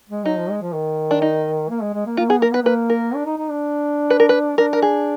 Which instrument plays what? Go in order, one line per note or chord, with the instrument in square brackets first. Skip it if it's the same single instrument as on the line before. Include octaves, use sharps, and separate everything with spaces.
[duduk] G#3
[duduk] F#3 [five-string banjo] D#4
[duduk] F3
G#3
F3
D#3
[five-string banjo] D4
D#4
[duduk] A#3
G#3
G#3
A#3
[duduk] A#3 [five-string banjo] F4
[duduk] B3 [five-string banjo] G#4
[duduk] A#3 [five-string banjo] A#4
[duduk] B3 [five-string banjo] B4
[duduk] A#3 [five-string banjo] B4
[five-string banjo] A#4
[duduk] D4
D#4
D#4
D4
[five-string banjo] B4
A#4
B4
[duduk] D4 [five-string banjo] A#4
[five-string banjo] A#4
G#4